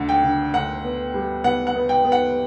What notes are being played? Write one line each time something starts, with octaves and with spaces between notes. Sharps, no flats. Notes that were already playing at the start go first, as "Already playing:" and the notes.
Already playing: D2 D3
G5
D3
D2 F#5
B3
G3
B3 F#5
F#5
B3
G5
B3
F#5